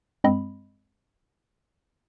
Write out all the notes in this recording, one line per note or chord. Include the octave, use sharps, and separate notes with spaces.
G2 G#3 C4 D#5 B5